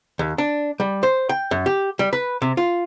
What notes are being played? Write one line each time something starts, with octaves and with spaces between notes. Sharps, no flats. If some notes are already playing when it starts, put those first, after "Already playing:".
D#2
D4
G3
C5
G5
F#2
G4
G3
B4
C3
F4